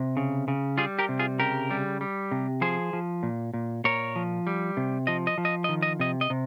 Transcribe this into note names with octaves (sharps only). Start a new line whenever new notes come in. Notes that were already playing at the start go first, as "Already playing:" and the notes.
Already playing: C3
C#3
C#3
G3 F4 G#4
G4 A#4
C3
F4 G#4
C#3 G4 A#4
G3
G3
C3
F3 G#4 C5
F3
A#2
A#2
A#2 A#4 C#5
F3
G3
C3
F3 D#5
D#5
F3
D#5
D#5
D#3
D#5
C3 D#5
D#5
C3